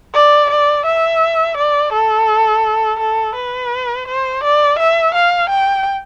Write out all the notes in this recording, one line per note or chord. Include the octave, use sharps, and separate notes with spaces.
D5
D5
E5
D5
A4
A4
B4
C5
D5
E5
F5
G5